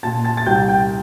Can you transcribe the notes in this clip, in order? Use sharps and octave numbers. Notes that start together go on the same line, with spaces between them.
A#2 A5 A6
A5 A6
A6
C2 G5 G6
G5 G6